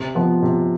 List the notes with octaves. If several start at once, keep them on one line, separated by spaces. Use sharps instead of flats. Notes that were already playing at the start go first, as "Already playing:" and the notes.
Already playing: C3
F3 B3 F4
C3